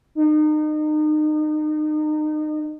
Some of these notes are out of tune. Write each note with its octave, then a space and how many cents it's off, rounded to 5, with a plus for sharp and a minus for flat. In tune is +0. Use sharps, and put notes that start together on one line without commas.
D#4 -30